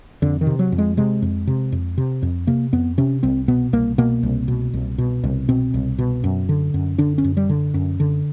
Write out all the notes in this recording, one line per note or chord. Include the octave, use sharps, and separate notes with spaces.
F2 D3
D#3
C3
F#3
F2
G#3
C3 G#3
F2
C3
F2
C3
F2
C3 A#3
F2 B3
C3 C#4
C2 C4
B2 B3
C2 A#3
B2 A#3
C2
B2
C2
B2
C2
B2 C4
C2
B2
F#2
D3
F#2
D3 D4
C#4
F#2
G3
D3
F#2
D3